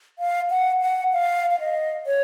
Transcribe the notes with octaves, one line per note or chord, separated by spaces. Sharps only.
F5
F#5
F#5
F5
F5
D#5
C#5